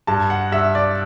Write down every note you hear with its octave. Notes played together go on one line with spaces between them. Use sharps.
G2 A5
F#5
G2 E5
D5